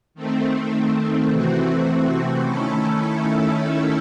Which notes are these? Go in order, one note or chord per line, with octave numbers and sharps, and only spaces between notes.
D#3 A3 C4
C3 E3 A3 C4 F#4
D#3 A3 C#4 E4 A4